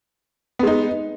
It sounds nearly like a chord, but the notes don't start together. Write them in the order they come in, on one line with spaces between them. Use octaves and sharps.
B3 G#3 D#4